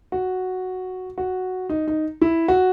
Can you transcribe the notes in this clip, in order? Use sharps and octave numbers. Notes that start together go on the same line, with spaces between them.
F#4
F#4
D#4
D#4
E4
F#4